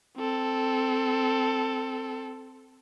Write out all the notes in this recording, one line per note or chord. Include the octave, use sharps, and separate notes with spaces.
C4 A4